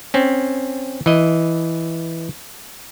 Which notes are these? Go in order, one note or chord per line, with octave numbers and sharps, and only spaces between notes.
C4 C#4
E3 D#5